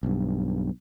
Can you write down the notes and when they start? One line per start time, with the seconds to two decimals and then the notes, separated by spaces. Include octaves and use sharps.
0.03 B1 G2